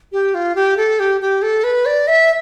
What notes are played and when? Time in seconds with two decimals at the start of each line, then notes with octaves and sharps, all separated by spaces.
0.12 G4
0.34 F4
0.55 G4
0.77 A4
0.99 G4
1.21 G4
1.42 A4
1.64 B4
1.86 D5
2.07 E5